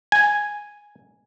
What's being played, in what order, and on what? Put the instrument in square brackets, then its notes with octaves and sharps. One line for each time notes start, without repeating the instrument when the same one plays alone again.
[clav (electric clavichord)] G#5